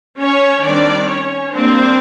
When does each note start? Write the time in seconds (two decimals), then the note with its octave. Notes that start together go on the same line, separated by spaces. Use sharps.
0.21 C#4 C#5
0.65 D#3 G3 C4 D4 D5
1.09 C#4 C#5
1.53 G3 A#3 C4 D4 C5